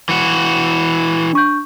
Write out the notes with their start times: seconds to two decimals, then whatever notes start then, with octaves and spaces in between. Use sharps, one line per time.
0.09 E3 F#4
1.33 D4 C#6 G6